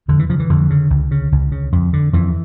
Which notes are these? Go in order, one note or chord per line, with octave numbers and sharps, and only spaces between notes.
F2 D3
E3
C#3 F3
E3
F2 D3
C#3
C#2
C#3
C#2
C#3
F2
D3
F2 E3